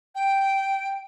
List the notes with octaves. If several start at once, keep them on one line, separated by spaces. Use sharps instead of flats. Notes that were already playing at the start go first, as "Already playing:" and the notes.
G5